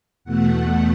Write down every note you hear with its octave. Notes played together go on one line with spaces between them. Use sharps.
E2 B2 A3 F#5